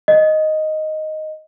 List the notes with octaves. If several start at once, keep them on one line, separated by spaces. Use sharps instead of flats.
D#5